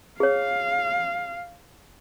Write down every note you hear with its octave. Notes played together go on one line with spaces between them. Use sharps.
G#4 C#5 F5